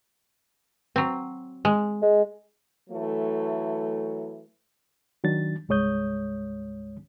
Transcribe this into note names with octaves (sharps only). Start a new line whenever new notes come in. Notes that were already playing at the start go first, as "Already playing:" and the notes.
F#3 C4
G#3
G#3
E3 F#3 A3
D#3 F#3 D4 A6
C2 G2 G#3 C#5 D#6 G6